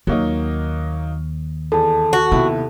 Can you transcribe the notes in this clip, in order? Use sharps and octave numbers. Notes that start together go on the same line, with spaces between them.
D#2 F#3 A#3 D#4
E2 A4 A5
F#4
D#2 C3 B3 E4